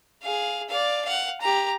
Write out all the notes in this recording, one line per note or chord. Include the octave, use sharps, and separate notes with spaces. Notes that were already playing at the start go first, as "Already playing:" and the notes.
G#4 F5
D5 F5
F5 F#5
G4 A#5